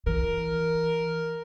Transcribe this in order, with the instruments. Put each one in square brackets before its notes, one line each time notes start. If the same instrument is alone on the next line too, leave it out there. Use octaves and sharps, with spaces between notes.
[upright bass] E3 [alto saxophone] A#4